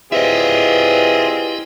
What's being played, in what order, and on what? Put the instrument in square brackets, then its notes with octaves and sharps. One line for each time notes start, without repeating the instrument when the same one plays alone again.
[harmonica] C4 F4 G#4 [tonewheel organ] E4 G4 [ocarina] B4 [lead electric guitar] D#5 E5